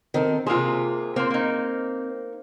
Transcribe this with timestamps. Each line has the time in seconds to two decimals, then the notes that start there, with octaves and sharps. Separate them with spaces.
0.14 D#3 C4 A4
0.47 C3 A#3 F4 G#4 C5
1.16 A#3 C4 C5
1.30 A#3 D#4